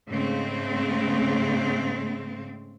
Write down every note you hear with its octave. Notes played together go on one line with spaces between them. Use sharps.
G#2 C#3 A3 C4